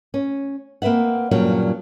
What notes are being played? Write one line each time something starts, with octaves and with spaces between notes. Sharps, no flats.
C#4
A#3 C4 B4 E5 F#5
G2 A#2 C#3 F#3 G3